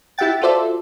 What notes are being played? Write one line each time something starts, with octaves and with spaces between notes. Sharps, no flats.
E4 G4 E5 F#5 G5 A6
F4 F#4 A4 C5 D5 E5